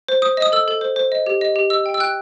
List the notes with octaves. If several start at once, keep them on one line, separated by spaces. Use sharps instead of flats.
C5
C5 D#6
D#5 D#6
A4 E6
A4
C5
C5
D#5
G4
D#5
G4
D#5 E6
G5
E6
G5 F#6